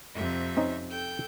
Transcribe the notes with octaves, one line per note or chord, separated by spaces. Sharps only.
F2 C3 E5
C4 C#4 D#4
A4 G5 G6